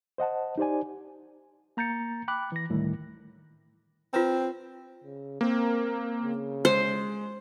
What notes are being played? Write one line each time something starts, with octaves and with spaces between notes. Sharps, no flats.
C5 D#5 F#5 A5
D#4 G4 C5 D5 G#5
A#3 A#5 G6 A6 C#7
G5 B5 D6 F#6
E3 A#6
D2 A2 D#3 G3
C4 F4 B4 A#5
C#3
A#3 C4 A#4
C#3
G#3 C5